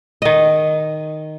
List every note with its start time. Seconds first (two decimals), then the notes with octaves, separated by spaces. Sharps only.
0.22 D#3 D#5